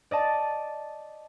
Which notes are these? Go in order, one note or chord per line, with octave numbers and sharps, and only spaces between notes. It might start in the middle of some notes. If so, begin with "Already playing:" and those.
D5 D#5 A5